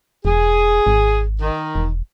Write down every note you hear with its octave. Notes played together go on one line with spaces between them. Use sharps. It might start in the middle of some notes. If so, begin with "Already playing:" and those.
E1 G#4
G#1
D#3
E1